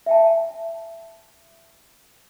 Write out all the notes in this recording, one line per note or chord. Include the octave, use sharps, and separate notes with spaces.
E5 G5 A5